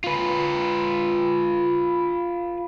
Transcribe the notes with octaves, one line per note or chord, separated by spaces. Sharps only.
F4 B4